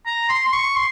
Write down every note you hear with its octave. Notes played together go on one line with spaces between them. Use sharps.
A#5
C6
C6
C#6
C6